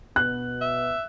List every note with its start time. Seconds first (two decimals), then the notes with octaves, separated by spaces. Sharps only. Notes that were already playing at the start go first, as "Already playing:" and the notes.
0.16 B2 B3 F#6
0.61 E5